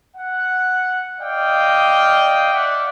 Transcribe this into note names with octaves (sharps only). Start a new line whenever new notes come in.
F#5
D5 D#5 F5 G5
D5 E5 F#5